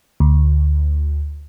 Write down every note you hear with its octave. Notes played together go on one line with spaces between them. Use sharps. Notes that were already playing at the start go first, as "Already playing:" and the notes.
D2